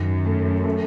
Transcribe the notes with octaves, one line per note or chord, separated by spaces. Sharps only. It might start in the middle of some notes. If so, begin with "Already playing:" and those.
Already playing: F#2 D#3
A3
A3